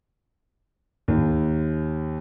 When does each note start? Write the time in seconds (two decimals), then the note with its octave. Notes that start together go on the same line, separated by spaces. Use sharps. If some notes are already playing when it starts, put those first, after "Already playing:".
1.08 D#2